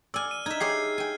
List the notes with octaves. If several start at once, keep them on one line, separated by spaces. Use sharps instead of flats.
D5 G#5 E6 F6
D#7
D#4 E5 G#6
G4 G#4 C#5 C7
G5 G#5